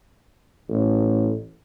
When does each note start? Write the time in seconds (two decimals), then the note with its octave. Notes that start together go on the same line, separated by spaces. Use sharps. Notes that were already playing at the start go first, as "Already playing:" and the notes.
0.69 A1